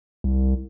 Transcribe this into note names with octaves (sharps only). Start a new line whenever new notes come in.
C2